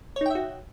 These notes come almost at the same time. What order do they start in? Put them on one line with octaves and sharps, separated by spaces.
C#5 D#4 G5 E5 F#4